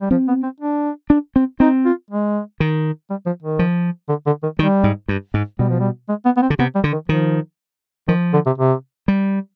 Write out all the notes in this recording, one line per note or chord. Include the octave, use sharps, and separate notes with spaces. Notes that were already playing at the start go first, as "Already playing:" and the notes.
G3
F3 C4
B3
C4
D4
D4
C4
C4 D#4
F4
G#3
D#3
G3
F3
D#3
F3
D3
D3
D#3
D#3 G3
G#2
G2
G#2
B2 G3
F3
G3
G#3
B3
B3
C4
D3
C3 B3
G3
D3
D#3
D#3 F3
D#3 F3
D3
C3
C3
G3